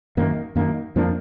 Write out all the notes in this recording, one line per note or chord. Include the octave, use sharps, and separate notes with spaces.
F#2 D#3 A#3
F#2 D#3 A#3
F2 F3 A#3 D4